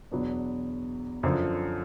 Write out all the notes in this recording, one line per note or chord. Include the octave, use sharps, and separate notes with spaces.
E2 B2 F#3 B3 D4
F#2 D3 F3